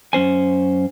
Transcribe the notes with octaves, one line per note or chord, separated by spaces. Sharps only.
F#2 C#4 C5 G#5